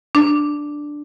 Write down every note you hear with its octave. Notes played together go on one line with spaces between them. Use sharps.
D4